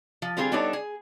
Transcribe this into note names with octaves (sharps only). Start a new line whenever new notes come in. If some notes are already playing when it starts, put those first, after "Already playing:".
F3
D3 G3 C4 F4 G#4
G3 B3 D4 D#4 A4 C#5
G#4